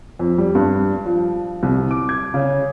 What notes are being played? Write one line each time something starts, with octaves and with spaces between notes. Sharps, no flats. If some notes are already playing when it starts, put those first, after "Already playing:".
F2
G3
G2
F3
C2
D6
G#6
C#3